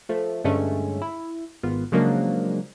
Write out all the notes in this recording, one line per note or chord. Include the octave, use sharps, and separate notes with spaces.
F3 A3
G2 D3 G#3 A3 C#4
E4
G#1 B3 F4
C#3 F3 F#3 G#3 A#3 D4